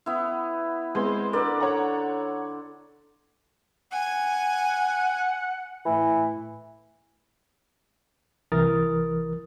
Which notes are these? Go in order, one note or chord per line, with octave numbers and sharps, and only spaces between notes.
B3 E4
G#3 B3 C4 C5
D3 A#4 B4 D5
C#5 F#5 A#5
F#5 G#5
A2 E3
C2 E3 A#4 D#6 F6 A6